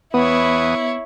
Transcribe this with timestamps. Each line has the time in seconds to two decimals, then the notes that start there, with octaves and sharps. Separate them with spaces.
0.14 E2 B3 E4 B4 C#5 D#6